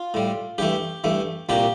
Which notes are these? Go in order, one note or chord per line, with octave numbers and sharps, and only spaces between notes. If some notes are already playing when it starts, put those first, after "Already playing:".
Already playing: F4
A2 G3
G2 E3 A3 G4
G2 E3 A3
C2 A#2 G3 G4